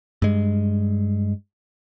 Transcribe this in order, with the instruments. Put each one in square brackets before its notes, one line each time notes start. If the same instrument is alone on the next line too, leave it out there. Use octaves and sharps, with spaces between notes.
[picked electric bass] G2 G#3